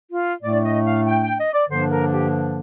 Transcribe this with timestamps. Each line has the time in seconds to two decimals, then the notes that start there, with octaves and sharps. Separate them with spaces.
0.11 F4
0.42 A2 A3 D4 D5
0.64 D#5
0.85 F5
1.06 G5
1.22 G5
1.38 D#5
1.53 D5
1.69 G2 D3 F3 A#3 D4 C5
1.90 A#4
2.12 G4